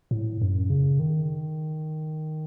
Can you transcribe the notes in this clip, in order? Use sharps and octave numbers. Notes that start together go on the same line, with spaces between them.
A2
F#2
C#3
D#3